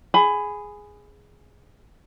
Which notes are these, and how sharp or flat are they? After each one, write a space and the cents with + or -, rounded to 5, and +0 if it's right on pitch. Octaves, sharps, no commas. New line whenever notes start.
G#4 +0 B5 +20